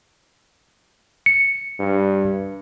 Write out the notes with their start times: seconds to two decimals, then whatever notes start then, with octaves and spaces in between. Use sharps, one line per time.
1.26 C#7
1.79 G2